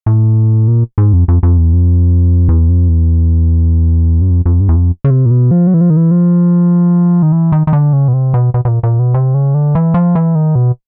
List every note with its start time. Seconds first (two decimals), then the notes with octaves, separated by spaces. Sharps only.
0.06 A2
0.68 A#2
0.98 G#2
1.13 F2
1.28 F2
1.43 F2
1.58 E2
1.73 F2
2.49 E2
2.69 F2
2.89 E2
4.21 F#2
4.30 F2
4.46 F2
4.61 G2
4.69 E2
4.76 F2
5.04 C#3
5.10 C3
5.26 A#2
5.31 B2
5.51 F3
5.67 F#3
5.74 E3
5.81 F3
5.90 D#3
5.97 E3
6.11 F3
7.22 D#3
7.32 E3
7.52 D#3
7.67 D#3
7.73 D3
7.93 C#3
8.08 B2
8.14 C3
8.34 B2
8.54 B2
8.65 B2
8.68 A#2
8.83 A#2
8.99 B2
9.14 C3
9.34 C#3
9.54 D3
9.75 E3
9.94 F3
10.15 E3
10.35 D#3
10.55 B2